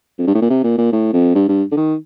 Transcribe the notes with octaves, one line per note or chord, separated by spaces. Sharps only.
F2
G2
A2
A#2
C3
A#2
A#2
A2
F2
G2
G2
D3
D#3